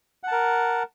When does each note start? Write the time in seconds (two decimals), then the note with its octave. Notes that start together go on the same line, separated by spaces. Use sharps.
0.23 F#5
0.28 A5
0.32 A#4